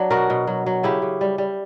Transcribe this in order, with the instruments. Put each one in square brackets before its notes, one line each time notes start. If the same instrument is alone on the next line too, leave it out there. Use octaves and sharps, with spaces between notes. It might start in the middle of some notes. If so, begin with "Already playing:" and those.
Already playing: [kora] F#3 D4
B2 F#4 A#4
B2
F#3
F#3
C#3 E4 G4
C#3
G3
G3